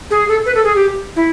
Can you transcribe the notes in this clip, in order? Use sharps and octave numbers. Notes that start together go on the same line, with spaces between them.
G#4
A4
B4
A4
G#4
G4
E4